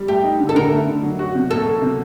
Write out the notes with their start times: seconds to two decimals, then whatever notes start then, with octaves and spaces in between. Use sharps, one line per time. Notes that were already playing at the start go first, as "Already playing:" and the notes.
Already playing: G3
0.08 A3 G4
0.23 D#4
0.40 D3
0.49 A4
0.55 D3 A#4
0.71 A3
0.87 D3
1.03 F#3
1.19 F#4
1.35 C3
1.50 A#3 A4
1.67 A#3
1.82 C3